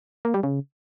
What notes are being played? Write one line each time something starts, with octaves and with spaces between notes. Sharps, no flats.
A#3
G3
C#3